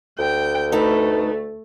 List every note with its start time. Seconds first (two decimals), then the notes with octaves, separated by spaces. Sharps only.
0.19 D2 G5
0.72 A3 D#4 A4 B4